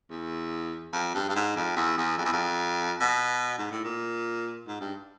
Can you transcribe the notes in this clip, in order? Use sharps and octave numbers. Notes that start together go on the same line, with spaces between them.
E2
F2
G2
G2
G#2
F2
E2
E2
F2
E2
F2
B2
G#2
A2
A#2
G#2
G2